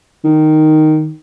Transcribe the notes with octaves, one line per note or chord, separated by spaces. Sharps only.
D#3